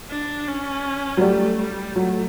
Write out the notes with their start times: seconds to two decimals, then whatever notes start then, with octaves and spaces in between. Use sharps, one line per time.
0.10 D4
0.48 C#4
1.17 F#3
1.21 G3 A3
1.59 G3
1.95 F#3 A3